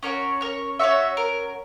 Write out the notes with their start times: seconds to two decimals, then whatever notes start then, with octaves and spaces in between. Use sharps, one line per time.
0.03 C#4 F#4 A#4 C#5
0.41 A#4 C#5
0.79 C#4 F#4 C#5 E5
1.17 A#4